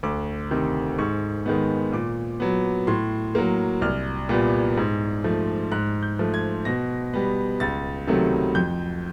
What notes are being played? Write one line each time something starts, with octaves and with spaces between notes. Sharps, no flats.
D2 D6
C3 D#3
G#2 C#6
D#3 G#3 B3
A#2 D6
F#3 B3
A2 C6
F#3 A#3
C2 F6
A#2 G3 B3
G#2
F3 A3
G#2 F#6
G6
F3 A3
G#6
B2 A#6
G3 B3
C#2 A6
C3 D#3 F#3 A3
F2 G6